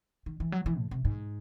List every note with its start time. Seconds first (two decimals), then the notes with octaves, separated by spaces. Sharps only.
0.26 D#3
0.40 E3
0.52 F#3
0.66 E3
0.78 A2
0.91 C3
1.05 G#2